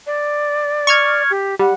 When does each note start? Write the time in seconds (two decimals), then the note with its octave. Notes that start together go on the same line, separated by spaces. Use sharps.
0.06 D5
0.87 C#6 F6 G#6
1.30 G4
1.59 G3 F#5